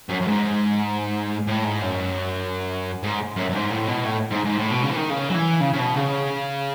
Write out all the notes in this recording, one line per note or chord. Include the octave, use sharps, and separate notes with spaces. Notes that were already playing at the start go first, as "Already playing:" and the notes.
F#2
F#2
G#2
A2
G#2
F#2
G#2
F#2
F#2
G#2
A2
B2
A2
G#2
G#2
A2
B2
C#3
E3
D#3
C#3
F#3
E3
C#3
C#3
B2
C#3